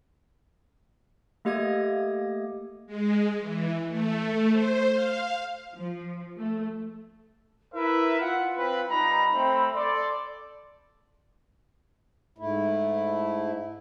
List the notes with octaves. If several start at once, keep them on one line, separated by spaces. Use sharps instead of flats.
A3 A#3 G4 D#5 D#6 G#6
G#3
E3
A3
C5
F5
F3
A3
E4 A#4 B4 E5
F4 F#5
C4 B4
G3 D#4 A#5 B5
A3 C4
A4 D5 C6
G#2 A3 E4